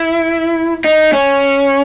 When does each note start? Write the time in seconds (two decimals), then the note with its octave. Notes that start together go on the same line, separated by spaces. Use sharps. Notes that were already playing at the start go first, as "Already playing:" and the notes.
Already playing: E4
0.84 D#4
1.13 C#4